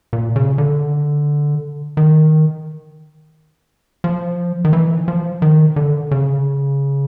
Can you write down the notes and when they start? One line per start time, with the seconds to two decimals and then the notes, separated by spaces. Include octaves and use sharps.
0.13 A#2
0.36 C#3
0.58 D3
1.97 D#3
4.04 F3
4.65 D#3
4.73 E3
5.08 F3
5.42 D#3
5.76 D3
6.11 C#3